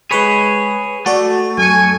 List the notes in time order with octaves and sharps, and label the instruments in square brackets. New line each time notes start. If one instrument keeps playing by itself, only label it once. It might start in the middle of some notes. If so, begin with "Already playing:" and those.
[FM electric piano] G#3 B4 B5 [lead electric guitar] G#4 C#5
[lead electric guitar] A3 [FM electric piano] F#4 A4 D5
[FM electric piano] F#2 C#7 [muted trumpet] G#5